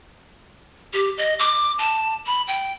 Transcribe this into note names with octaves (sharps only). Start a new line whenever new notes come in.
G4
D#5
D6
A5
B5
G5